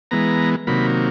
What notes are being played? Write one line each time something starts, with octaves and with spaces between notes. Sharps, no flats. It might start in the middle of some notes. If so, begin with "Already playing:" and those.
E3 G#3 B3 A#5
C3 D#3 F#3 A#3 B5